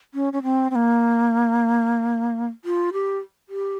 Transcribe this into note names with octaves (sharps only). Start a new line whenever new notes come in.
C#4
C#4
C4
C4
A#3
F4
G4
G4